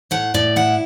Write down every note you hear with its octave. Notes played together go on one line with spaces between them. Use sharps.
A2 F#5
A2 D5
E4 F#5